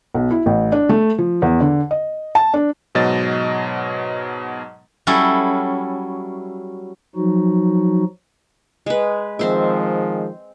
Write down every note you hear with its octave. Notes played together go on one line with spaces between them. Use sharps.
B1
E4
A1
D4
A3
F3
E2
D3
D#5
A5
D4
G#2 B2 F#3 D#5 A6
F#3 G3 C#4 E4 A4
F3 F#3 D#4 F#4
G#3 B4
D#3 F3 G#3 C4 C5 E5